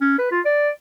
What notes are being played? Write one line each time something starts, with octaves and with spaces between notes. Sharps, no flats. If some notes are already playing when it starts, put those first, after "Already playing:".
C#4
B4
F4
D5